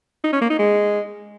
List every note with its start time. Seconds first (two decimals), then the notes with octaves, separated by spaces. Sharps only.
0.24 D#4
0.33 C#4
0.41 A#3
0.50 D#4
0.59 G#3